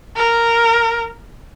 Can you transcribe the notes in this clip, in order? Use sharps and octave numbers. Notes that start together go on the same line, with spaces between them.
A#4